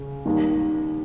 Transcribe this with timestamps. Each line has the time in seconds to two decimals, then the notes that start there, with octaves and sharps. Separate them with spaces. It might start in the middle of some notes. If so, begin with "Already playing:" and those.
Already playing: C#3
0.25 D#2 D#3 G3